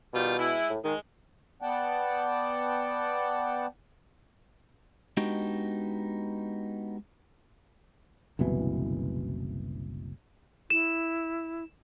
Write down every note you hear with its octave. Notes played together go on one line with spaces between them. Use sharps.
B2 D#3 G3 F4
G#3 E4
A2
D#3 G#3
B3 D5 F#5 G5 A5
G#3 B3 D4 D#4 F#4 G4
F#1 C2 B2 E3
E4 E7